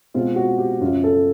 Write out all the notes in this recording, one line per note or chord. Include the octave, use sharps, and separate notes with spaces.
B2 G#3 C4 F4
F#4
G4
F#2 C#3 F3 F4
A4